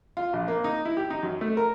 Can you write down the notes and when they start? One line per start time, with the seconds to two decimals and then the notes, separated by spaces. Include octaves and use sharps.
0.17 F4
0.33 A#1
0.48 A#3
0.64 D#4
0.85 E4
0.97 G4
1.10 D#4
1.23 F#2
1.41 A3
1.57 A#4